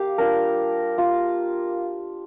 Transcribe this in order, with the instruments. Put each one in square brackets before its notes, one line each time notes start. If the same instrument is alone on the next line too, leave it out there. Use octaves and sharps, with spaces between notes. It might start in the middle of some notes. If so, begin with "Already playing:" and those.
Already playing: [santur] A#3 G4 F5
G3 D4 F4 A#4
A#3 F4